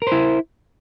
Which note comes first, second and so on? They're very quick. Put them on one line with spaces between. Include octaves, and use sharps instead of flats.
A#4 C5 E4